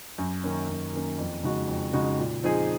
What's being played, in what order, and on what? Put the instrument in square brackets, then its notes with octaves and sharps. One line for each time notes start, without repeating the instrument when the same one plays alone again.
[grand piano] F#2
D#3 A#3 C#4
F#2
D#3 A#3 C#4
F2
C#3 G#3 D#4 F#4
F2
C#3 G#3 D#4 F#4
A#2
F3 C4 D#4 G#4